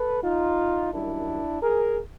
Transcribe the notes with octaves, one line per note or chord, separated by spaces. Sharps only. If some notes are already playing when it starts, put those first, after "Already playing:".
Already playing: A4 B4
D#4 F4
F#2 D#3 G3 D4 E4
G#4 A#4